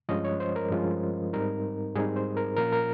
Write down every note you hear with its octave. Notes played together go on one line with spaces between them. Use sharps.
G2 F3 G#3 C#4 F4 D#5
C#5
C5
A#4
G2 F3 G#3 C#4 F4
G#2 G3 C4 D#4 A#4
G#2 G3 C4 D#4 G#4
C5
A#4
A#2 F3 A#3 C#4 F4 A#4
A#4